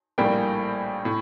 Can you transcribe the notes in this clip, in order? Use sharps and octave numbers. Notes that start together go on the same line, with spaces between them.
A#1 A2 G3 A#3 G5
A2